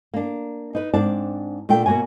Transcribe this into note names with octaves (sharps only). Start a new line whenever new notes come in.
A#3 D4
D#4 B4
G#2 C4 D4 D5 A5
A#2 A3 D4 G5
B2 A#3 F#4 C#5 G#5